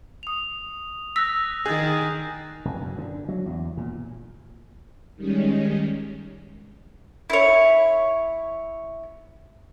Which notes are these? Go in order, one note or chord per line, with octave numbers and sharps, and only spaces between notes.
D#6 F7
E6 F#6 A#6 B6
D#3 G#4 F#6 G6 A6
F1
F#2
D3
F#3
E2
A#2
D#3 G3 G#3 C#4
E4 C#5